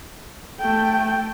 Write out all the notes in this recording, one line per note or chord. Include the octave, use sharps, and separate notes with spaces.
A3 G5